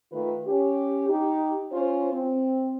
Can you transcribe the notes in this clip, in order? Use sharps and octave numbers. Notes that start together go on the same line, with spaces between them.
D#3 A3 F4 B4
C#4 G4
D#4 G4
C#4 F4 C5
C4